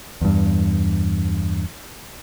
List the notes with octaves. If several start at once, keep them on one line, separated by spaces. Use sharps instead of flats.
E2 G2